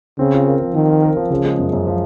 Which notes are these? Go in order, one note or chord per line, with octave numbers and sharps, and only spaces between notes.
C#3 C4
F4
A#4
F3
D#3 C4
F4
A#4
F3
C#3 F3
G#3
F#2
F#2
F3